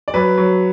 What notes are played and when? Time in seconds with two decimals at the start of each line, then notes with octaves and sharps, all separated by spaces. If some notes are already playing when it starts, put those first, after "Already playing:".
0.08 D5
0.14 F#3 B4
0.38 F#3